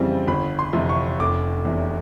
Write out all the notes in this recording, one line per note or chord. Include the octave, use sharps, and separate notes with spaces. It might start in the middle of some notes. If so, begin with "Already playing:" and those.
Already playing: F2 C#3 E3 G3 C4
G1 B5
C6
F2 C3 E3
C#6
F1 D6
E2 C3